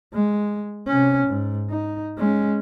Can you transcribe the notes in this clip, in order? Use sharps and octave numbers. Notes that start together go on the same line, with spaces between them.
G#3
C3 C#4
G#2
D#4
G#3 C#4